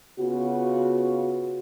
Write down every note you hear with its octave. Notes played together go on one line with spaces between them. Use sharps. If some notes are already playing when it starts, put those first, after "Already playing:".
C#3 B3 F4 F#4